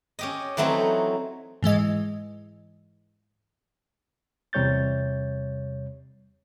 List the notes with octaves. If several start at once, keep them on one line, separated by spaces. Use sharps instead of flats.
C#4 G4 D#5
E3 F#3 A3 C4 D#4
G#2 E3 G#3 D#5
E2 C3 G3 C#5 G6 A6